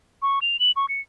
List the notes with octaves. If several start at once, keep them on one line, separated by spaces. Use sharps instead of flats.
C#6
F7
F#7
C#6
C#7